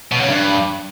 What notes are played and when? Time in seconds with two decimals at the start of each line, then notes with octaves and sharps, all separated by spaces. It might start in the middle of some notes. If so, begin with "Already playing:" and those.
0.12 B2
0.20 C#3
0.29 G2